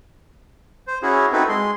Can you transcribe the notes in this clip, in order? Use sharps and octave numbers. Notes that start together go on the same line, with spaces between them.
C5
C#4 E4 F#4 G#4
C4 D#4 E4 F#4 A4 B4
G#3 C6